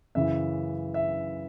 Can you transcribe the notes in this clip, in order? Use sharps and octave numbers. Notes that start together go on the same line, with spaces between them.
F#2 C#3 E3 E5
E5